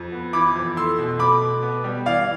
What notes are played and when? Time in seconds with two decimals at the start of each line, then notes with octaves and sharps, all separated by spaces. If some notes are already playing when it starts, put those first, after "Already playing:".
Already playing: F2
0.12 B3
0.33 E3 B5 D6
0.55 F2
0.76 A3 C6 E6
0.99 B2
1.19 A3 B5 D6
1.42 B2
1.63 B3
1.84 G3
2.06 E3 D5 F5